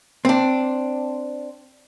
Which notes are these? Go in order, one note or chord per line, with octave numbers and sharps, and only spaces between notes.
C4 D4